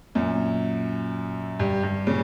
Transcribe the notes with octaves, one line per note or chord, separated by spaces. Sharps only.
F#2 A#2
G2
G2
A#2 C#3